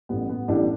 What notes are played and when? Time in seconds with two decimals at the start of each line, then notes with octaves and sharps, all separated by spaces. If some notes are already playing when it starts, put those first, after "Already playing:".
0.09 A1 A2 G3 B3
0.29 B3
0.48 A1 A2 G3 D4